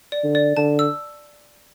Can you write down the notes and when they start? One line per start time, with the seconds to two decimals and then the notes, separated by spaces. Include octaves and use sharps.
0.12 D5
0.24 D3
0.35 D5
0.57 D3 A5
0.79 E6